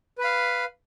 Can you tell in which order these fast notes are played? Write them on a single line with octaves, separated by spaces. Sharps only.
B4 B5 F5